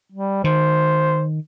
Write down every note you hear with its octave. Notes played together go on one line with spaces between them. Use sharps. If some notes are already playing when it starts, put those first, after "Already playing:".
G3
D#3 C5